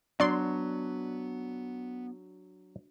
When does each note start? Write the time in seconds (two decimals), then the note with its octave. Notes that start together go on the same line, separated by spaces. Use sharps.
0.20 F#3 B3 D4 F#4 D5 C6